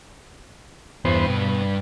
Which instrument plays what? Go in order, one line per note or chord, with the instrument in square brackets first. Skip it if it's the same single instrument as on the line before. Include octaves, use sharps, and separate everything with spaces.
[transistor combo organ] E2 B3 C5 [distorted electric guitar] G2
[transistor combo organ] B2